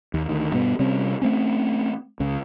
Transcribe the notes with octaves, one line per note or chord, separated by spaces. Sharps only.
D#2
D2 D#3
G2 B2 B3
C3 G3 C4 C#4
A3 C4 C#4
C#2 C#3